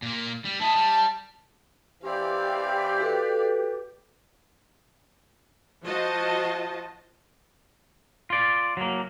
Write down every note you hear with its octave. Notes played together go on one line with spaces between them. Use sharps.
A#2 A#3
G3
E4 D#5 A5
G3
E3 C4 G4 D5 F5
F#4 A4 B4
F3 F4 F#4 C5 D#5 A5
F4 D5
F#3 A#3